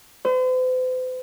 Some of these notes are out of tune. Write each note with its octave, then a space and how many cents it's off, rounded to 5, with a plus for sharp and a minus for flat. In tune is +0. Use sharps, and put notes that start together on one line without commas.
C5 -45